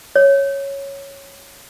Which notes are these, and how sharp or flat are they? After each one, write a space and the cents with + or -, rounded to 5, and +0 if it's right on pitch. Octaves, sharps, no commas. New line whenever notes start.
C#5 -5